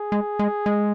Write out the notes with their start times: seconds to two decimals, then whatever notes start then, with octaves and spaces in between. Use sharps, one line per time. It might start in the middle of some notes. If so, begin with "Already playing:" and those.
Already playing: G#4
0.12 G#3
0.39 G#3
0.66 G#3